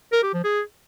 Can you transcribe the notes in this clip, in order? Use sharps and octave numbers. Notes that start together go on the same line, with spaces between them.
A#4
G4
F3
G#4